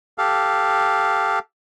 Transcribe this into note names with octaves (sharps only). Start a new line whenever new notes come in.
G4 A4 F5